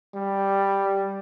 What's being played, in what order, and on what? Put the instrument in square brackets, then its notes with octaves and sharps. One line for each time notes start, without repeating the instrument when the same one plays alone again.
[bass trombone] G3